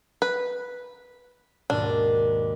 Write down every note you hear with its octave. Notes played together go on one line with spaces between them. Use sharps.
B4
D#2 G#2 B2 D4